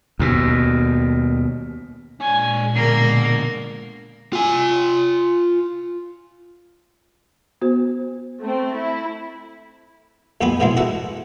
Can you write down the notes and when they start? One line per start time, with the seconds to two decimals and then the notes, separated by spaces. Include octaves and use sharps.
0.19 D#2 B2
2.20 A#2 G#3 D4 C#5 G#5
2.75 B2 D3 A#3 A#4 C7
4.33 F4 G#5
7.61 B3 F#4 C5
8.40 A3 C4
8.75 E4
10.41 A#1 F2 B3 G4 G#5 B5
10.60 G#2 B2 D#3 E3 G#3 C4
10.77 F#4 A4 E5 F#5